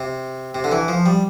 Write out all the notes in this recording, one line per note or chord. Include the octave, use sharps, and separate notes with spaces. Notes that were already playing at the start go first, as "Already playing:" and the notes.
Already playing: C3
C3
D3
E3
F3
G3